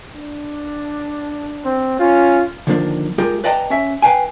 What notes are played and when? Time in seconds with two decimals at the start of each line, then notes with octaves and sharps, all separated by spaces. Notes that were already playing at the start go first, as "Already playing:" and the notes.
0.15 D4
1.65 C4
1.99 C#4 F4
2.67 D3 D#3 F3 A#3 C#4 D4
3.18 G#3 F4 G4 G#4 A#4
3.44 B4 D5 D#5 G5 A5 A#5
3.70 C#4 E5
4.02 B4 C5 F5 G5 G#5